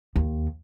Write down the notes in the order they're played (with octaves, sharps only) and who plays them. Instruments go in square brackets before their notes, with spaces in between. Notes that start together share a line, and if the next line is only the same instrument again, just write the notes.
[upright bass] D#2